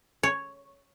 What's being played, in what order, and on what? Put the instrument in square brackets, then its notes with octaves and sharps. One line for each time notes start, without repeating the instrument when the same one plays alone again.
[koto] C#5